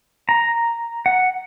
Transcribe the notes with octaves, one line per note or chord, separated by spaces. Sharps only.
A#5
F#5